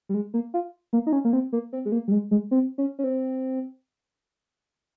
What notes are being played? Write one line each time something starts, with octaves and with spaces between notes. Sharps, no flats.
G3
G#3
A#3
F4
A#3
D#4
C#4
A#3
C4
A#3
C4
G#3
A#3
G3
G#3
G#3
C4
C#4
C#4
C4